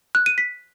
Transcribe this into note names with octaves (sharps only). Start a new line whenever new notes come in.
F#6
D#7
B6